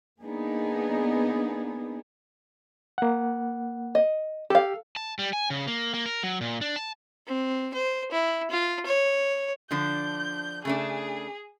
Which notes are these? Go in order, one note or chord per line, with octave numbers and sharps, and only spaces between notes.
A#3 B3 D4 D#4 G#4
A#3 F#5
D#5
G4 A4 F5
A5
G3
G#5
C#3
A#3
A#3
A#4
F#3
A#2
D4
A5
C4
C5
E4
F4
C#5
D3 F3 D4 G6
C#3 A3 D4 G#4